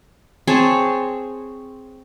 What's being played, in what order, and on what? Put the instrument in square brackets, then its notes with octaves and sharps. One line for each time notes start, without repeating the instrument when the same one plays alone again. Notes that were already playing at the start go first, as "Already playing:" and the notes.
[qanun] C4 G#4 C#5 A5